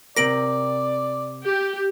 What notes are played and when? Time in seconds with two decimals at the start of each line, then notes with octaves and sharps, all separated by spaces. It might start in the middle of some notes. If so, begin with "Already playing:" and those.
0.17 C3 C4 A#4 D5 A#6 D7 F#7
1.45 G4